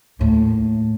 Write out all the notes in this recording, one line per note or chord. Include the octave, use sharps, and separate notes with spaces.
D#2 A2